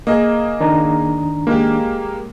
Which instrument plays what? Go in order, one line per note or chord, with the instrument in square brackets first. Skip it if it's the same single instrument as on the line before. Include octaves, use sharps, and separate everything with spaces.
[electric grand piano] A#3 G#4 [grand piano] D#5
[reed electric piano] D#3 D4 A#5
[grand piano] G#3 G4 [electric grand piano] A#3